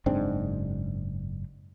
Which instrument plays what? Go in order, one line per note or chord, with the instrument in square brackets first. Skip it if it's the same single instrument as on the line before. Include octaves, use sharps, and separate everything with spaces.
[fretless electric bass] F#1 G#2 C4 D4